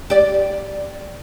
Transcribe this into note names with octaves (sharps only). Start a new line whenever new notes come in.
G4 D5